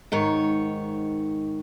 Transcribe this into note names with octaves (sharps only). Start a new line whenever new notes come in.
G#2 D#3 C#5